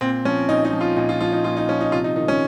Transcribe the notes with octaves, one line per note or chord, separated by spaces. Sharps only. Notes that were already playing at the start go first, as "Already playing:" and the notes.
A#2 C4
F3 C#4
A#2 D#4
D#4
F3
F4
A#2 D#4
F4
F3 F4
D#4
A#2 F4
D#4
F3 C#4
D#4
C3 F4
D#4
D#3 D#4
C#4